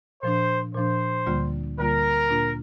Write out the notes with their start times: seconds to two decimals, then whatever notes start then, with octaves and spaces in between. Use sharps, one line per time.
0.23 A#2 F3 D4 C5
0.75 A#2 F3 D4 C5
1.26 D2 D3 G3 A#3 F4
1.79 D2 D3 G3 A#3 F4 A#4
2.30 A#2 A#3 D4 F4